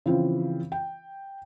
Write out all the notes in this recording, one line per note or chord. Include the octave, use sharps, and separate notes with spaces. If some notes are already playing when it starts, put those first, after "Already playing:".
C#3 E3 F3 C4
G5